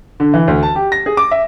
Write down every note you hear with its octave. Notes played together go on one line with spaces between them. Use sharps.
D3
E3
D2
A5
G4
A#6
G#4
D6
E5